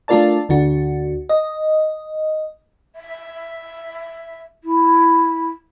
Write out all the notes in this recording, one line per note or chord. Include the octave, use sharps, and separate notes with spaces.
A3 D4 F4 A#4 D5 A5
D2 D4 F#4
D#5
E5
E4